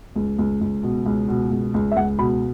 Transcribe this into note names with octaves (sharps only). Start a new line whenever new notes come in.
C#2
C#2
C#2
B2
C#2
B2
C#2
C#2
E5
C#2 F#5
B2 B5